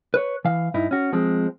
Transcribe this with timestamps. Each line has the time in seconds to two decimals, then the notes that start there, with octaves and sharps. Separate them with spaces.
0.14 B4 C#5
0.45 E3 F5
0.74 G2 D#4 E4
0.91 C#4 F#4
1.13 F3 G#3 C4